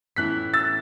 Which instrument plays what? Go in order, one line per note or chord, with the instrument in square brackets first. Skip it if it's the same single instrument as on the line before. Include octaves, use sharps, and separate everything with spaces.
[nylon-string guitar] A2 E3 C#4 E4 [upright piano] F#6 B6
[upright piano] E6 A6